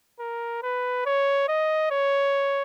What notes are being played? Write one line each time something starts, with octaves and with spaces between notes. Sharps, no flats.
A#4
B4
C#5
D#5
C#5